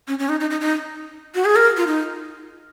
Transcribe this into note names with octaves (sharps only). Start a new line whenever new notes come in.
C#4
C#4
D#4
D#4
D#4
D#4
F#4
G#4
A#4
F4
D#4